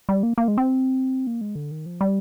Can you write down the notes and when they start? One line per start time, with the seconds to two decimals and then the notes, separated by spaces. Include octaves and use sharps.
0.09 G3
0.23 A#3
0.38 A#3
0.48 G#3
0.58 C4
1.27 A#3
1.41 G#3
1.55 D3
1.71 D#3
1.86 F3
2.01 G3